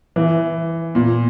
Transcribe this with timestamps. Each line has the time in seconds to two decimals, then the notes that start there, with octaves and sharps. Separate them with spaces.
0.16 E3
0.95 A#2